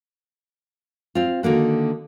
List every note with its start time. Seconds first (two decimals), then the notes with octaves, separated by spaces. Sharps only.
1.15 C4 F4
1.43 D3 D#3 A#3 F#4